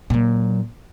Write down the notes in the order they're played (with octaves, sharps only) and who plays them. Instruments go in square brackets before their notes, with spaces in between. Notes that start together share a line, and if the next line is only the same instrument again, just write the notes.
[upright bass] A#2 F#3